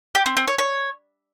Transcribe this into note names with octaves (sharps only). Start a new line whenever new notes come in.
G4
C4
C4
C#5
C#5